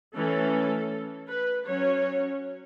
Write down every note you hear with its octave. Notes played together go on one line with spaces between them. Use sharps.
E3 A3 C#4 A4
B4
F#3 C#4 C#5